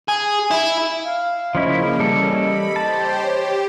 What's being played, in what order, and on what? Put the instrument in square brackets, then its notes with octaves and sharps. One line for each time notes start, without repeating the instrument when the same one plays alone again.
[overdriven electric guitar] G#4
E4
[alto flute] F5
[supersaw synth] C#3 A#3 [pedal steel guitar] F3 C#4 E4 [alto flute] D#5
[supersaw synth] E3 C#4 [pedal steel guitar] G3 A4
[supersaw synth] B5
[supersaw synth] G4 C5 [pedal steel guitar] A5
[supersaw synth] G4 [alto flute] C#5